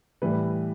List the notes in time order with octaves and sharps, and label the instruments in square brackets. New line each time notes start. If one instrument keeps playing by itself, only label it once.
[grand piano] A2 E3 G3 B4